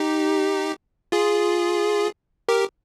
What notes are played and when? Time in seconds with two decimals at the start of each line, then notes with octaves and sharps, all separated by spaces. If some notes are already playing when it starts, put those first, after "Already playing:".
Already playing: D#4 G4
1.12 F4 G#4
2.49 G4 A#4